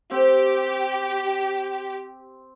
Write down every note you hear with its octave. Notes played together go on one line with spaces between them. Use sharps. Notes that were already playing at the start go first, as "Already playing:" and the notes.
C4 G4